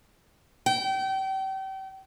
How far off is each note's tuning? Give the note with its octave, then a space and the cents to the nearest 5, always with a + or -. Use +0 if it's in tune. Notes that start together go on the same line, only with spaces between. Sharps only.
G5 -35